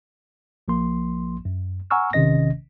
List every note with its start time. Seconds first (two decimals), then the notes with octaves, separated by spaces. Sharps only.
0.68 A#1 F3 A#3 C6
1.45 F#2
1.91 F#5 G#5 A#5 C#6 E6 F6
2.13 A1 C3 D#3 C#4 D#5 A#6